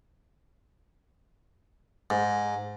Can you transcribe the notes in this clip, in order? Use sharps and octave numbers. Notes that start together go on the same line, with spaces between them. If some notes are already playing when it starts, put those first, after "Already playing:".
G#2